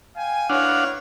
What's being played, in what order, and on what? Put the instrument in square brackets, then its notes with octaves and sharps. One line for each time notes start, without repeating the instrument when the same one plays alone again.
[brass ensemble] F5 G5 G#5
[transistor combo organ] D4 F5 F#5 [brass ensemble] E4 B4 C#5